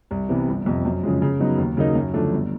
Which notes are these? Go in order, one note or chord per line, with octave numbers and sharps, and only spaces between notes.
C2
C3 E3 G3 B3
G1
F2 C3
F#2
C#3 F3 G#3
C#3
F#3 B3 D#4
D#2
C#3 F#3 A#3 D#4
F#2
D3 F3 A3 D4
G1